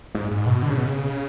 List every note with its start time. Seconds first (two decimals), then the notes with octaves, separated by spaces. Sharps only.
0.15 G#2
0.31 G#2
0.46 B2
0.62 D3
0.70 C#3
0.77 B2
0.86 C#3